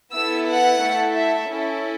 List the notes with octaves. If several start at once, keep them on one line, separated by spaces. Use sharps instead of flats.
B3 E4 A4 E6
F#5
A3 E4 A4
E5
C#4 E4 A4